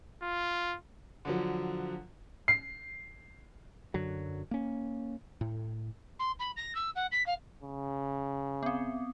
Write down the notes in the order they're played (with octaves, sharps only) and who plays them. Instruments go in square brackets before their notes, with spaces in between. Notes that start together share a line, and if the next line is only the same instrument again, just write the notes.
[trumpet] F4
[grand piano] D3 F3 F#3
[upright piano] C7
[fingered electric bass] F#2 D3 F#3
A#3 C#4
A2
[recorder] C6
B5
A#6
E6
F#5
B6
F5
[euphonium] C#3
[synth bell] B3 C4